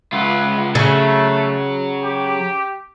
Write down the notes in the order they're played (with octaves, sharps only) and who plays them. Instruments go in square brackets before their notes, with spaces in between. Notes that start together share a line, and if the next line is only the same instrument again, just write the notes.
[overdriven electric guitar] C#2 F4 [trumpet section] E5 F#5 B5
[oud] C#3 [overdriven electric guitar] F#3 [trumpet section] A3
[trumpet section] G4